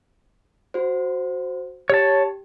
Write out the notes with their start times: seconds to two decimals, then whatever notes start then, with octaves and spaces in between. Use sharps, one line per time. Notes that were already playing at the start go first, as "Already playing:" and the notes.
0.74 F#4 C5
1.90 G4 C#5 A5